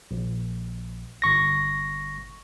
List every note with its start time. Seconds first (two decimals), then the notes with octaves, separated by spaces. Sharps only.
0.11 A#1
1.22 G1 C#6 A#6